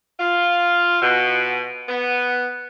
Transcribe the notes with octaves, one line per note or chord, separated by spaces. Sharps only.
F4
B2
B3